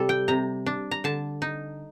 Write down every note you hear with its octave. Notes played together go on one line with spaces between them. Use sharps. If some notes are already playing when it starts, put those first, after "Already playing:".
Already playing: C3 G3 A4
G5
C3 A#5
D4
A#5
D3 A5
D#4